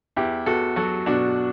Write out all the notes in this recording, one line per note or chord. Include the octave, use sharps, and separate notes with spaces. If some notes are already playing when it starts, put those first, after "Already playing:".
E2 E4 G4
E2 F#4 A4
F#3 F#4 A4
B2 D4 F#4